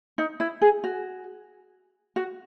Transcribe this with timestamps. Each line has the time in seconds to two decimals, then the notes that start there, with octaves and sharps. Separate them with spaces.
0.18 D#4
0.40 E4
0.61 G#4
0.84 F#4
2.16 F#4